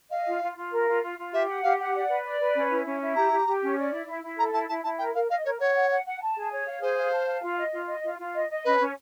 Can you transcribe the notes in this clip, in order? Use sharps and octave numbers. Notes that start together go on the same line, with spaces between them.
D#5 F5
F4
F4
F4
A#4
F4
F4
F4
G4 E5
F#5
G4 F5
F#5
D5
B4
D5
B4
C#4
E4
C#4
E4
G4 A#5
G4
G4
C#4
D5
E4
E4
E4
A4 A#5
E4 A5
E4 A5
E4 A5
A#4 G5
A#4 F5
D#5 F5
A#4 C#5
C#5 F#5
F#5
F#5
F#5
A5
G#4
C#5
F5
G#4 C5
F5
A5
F5
F4
D#5
F4
D#5
F4
F4
D#5
D#5
C#4 B4
C#4